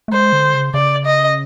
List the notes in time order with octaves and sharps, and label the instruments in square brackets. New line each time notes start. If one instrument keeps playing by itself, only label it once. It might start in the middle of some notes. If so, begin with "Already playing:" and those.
[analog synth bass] A3
[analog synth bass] G#3 [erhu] C5
[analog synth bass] D3
C#3
[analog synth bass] C#3 [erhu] D5
[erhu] D#5